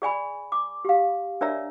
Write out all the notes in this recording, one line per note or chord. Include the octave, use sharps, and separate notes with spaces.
G#4 D5 G#5 B5
D6
G4 F5
D4 A#4 C#5 D5 E5 A#5